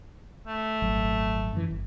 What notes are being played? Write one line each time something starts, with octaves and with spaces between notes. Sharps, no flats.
A3
D#1 G#1 F#3
F#2 E3
G1